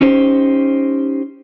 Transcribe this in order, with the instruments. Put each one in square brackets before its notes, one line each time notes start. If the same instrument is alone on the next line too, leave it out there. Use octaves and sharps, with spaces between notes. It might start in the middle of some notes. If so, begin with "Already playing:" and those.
[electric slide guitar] C#4 D#4 G4 C5